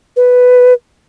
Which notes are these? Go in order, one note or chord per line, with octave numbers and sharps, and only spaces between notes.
B4